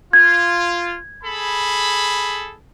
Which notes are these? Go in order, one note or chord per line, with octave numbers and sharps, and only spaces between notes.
F4 G#6
G#4 A4 B5